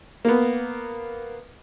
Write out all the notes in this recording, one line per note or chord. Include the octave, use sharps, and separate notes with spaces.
A#3 B3